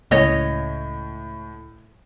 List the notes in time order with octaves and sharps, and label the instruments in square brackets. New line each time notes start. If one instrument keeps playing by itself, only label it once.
[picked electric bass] C#2 [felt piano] A2 [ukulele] C#5 D#5